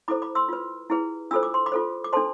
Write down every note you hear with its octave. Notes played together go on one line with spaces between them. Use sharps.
E4 A4 C5 B5 D6
B5 D6
C6 E6
F4 B4
E4 G#4 B4
D4 F4 A4 C5 E6
D6
C6
B5 D6
F4 A4 C5
D6
D4 A4 C5 A5 C6